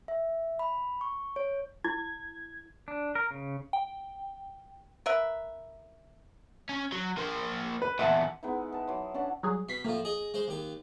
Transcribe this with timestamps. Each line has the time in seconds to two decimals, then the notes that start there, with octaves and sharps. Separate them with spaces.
0.08 E5
0.59 B5
1.01 C#6
1.36 C#5
1.84 E4 G#6
2.88 D4
3.15 A#4
3.31 C#3
3.73 G5
5.06 A#4 B4 E5
6.69 C#4
6.92 F#3
7.18 A#3 C5
7.82 B4
7.99 E2 A#2 E5 F#5 A5
8.43 G#3 B3 D#4 E4
8.72 B4 A5
8.88 E3 F#3 C6
9.14 C#4 D4 F#5 A5
9.43 F#3 G3 G#4
9.69 B2 B6 C7
9.85 A2 F3 A#3
10.05 G#4 D#5
10.34 G#3 C5
10.48 D#2 G4